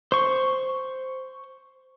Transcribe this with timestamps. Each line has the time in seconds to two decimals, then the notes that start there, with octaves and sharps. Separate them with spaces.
0.12 C5 C#6